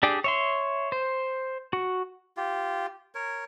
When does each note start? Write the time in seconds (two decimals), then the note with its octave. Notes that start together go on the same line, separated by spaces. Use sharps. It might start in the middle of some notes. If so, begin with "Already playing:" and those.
0.03 D4 G4 G#4 D5
0.24 C#5 E5 C6
0.92 C5
1.73 F#4
2.37 F4 G4
3.15 A#4 C#5